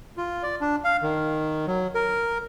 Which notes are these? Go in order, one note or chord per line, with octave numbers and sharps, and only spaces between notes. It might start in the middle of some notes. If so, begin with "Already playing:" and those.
F4
D5
D4
F5
D#3
F#3
A#4